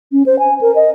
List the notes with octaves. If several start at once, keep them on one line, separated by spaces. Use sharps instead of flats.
C#4
C5
G#5
A#4
D#5